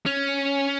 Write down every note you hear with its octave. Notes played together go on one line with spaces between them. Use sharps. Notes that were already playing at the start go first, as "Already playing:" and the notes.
C#4